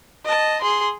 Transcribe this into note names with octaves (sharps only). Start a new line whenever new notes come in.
D#5 A5
G#4 C6